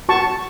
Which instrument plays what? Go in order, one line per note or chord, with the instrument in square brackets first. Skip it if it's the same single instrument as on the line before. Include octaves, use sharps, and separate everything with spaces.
[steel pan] F#4 A5 C#6